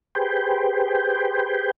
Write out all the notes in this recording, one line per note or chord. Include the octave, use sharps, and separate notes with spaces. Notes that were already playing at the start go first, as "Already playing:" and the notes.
G4 G#4 B4 C5 G5